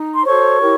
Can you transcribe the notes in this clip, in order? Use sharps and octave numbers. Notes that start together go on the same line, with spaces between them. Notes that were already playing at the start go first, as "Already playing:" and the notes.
Already playing: D#4
C6
F#4 A4 C5 C#5 C#6
E4 G4 A#4